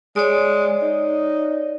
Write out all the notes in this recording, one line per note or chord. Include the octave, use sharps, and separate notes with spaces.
G#3 C#5 D5
D#4